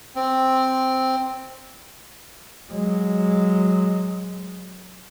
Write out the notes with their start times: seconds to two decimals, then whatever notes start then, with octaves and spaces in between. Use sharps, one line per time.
0.16 C4
2.72 F#3 G#3